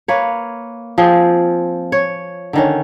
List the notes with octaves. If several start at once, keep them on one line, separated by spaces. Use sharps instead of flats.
A#3 B4 C#5
F3 C4 G#4
C#5
D3 D#3 C#4